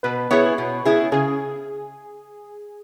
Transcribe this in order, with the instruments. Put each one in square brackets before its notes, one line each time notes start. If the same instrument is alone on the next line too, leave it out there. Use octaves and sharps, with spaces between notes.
[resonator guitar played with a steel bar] B2 [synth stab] B4
[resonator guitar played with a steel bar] B3 E4 G#4 [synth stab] C#5
[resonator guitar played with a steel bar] B2
B3 E4 G#4
[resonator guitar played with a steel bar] C#3 [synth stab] G#4